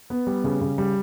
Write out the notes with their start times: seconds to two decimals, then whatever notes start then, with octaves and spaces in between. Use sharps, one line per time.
0.10 B3
0.27 G3
0.44 C#3
0.61 C#3
0.78 G3